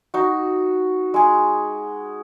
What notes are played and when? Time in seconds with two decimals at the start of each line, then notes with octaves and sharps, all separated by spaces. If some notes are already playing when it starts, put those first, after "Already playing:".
0.14 D#4 F#4
1.14 G#3 G#4